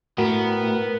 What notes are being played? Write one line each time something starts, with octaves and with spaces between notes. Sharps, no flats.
A2 B3 F#4 A#4